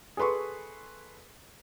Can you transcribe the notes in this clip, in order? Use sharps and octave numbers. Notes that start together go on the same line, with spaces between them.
G#4 A4 B4 C6 C#6